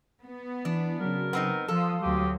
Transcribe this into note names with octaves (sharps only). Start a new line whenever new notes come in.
B3
E3 D4
C#3 F#3 A#4
B3 C4 D#4
F3 A4 F5 C6 D#6
D2 F#3 G4